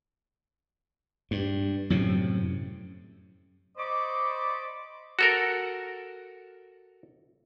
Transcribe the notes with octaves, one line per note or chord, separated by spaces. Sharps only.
G2
F#2 A2 C3
C5 D5 D#5 B5 C#6 D6
F#4 A4 A#4